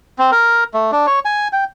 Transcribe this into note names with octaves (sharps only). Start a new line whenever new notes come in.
C4
A#4
A3
D4
C#5
G#5
G5